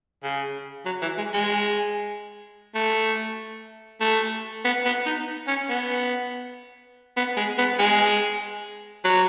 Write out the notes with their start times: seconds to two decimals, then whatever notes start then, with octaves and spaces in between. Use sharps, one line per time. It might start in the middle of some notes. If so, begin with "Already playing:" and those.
0.23 C#3
0.85 F#3
1.02 E3
1.18 G#3
1.33 G#3
2.75 A3
4.00 A3
4.65 B3
4.85 B3
5.06 D#4
5.47 C#4
5.69 B3
7.17 B3
7.37 G#3
7.58 B3
7.79 G#3
9.05 F#3